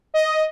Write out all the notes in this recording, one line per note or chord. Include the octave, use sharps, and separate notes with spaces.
D#5